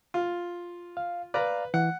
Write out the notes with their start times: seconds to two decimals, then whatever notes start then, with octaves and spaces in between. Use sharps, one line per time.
0.14 F4
0.97 F5
1.34 B4 D5 F5 A#5
1.74 E3 F#5